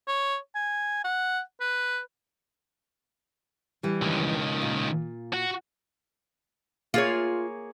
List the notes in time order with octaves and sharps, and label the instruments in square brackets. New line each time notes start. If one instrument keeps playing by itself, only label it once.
[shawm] C#5
G#5
F#5
B4
[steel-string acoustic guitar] E3 G3
[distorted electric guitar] C#2 D#3
[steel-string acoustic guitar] A#2
[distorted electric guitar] F#4
[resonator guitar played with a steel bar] A#3 G#4 C#5 [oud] F4